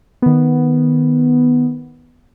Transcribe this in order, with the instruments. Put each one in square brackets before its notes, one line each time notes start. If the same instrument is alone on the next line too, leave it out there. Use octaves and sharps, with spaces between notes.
[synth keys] D#3 B3